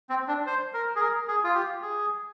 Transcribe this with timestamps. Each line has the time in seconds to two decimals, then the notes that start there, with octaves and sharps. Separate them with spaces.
0.10 C4
0.28 D4
0.47 C5
0.74 A#4
0.96 G#4
1.00 A#4
1.28 G#4
1.44 F4
1.54 G4
1.82 G#4